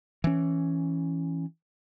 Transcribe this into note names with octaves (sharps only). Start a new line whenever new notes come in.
E3 C#4